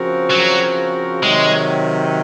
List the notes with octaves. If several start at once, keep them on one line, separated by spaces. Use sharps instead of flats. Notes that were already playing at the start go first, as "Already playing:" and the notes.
Already playing: C#3 F3 C4 F#4 A#4
F#3
C3 D#3 F#3 G#3